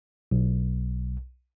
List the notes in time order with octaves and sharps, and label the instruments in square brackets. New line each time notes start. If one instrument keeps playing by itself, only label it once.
[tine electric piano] B1